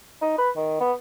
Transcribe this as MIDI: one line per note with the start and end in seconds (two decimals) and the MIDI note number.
0.22 0.38 63
0.38 0.50 71
0.57 0.78 51
0.81 0.93 59